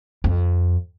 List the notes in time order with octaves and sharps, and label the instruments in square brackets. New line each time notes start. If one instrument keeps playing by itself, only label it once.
[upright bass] F2